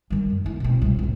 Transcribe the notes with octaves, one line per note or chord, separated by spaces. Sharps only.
D#3 G3
F#2
B3 E4
B2 C4
C2 F4
E2 A2